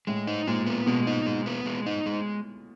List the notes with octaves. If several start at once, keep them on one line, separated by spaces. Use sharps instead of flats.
A2 G#3
D#4
A#2 G#3
B3
B2 G#3
D#4
G#3
B3
G#3
D#4
G#3